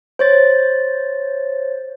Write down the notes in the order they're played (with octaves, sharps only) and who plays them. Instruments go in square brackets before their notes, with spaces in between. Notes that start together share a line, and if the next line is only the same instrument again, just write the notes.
[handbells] C5 C#5 A6